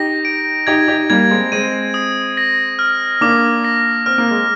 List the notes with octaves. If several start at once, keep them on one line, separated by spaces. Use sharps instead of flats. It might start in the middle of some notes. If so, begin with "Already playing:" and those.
Already playing: D#4 G4 A#6
D7
D#4 G4 G#6
D#4 G4
G3 A#3 G#6
G#3 C4
G#3 C4 D#7
D#6
A#6
F6
A#3 D4 D6
A#6
C4 F6
A#3
G#3